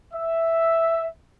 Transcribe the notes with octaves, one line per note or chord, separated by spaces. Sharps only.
E5